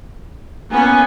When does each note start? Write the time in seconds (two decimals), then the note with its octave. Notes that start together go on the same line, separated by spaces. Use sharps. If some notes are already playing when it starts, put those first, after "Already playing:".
0.71 A#3 B3 C#4 G#5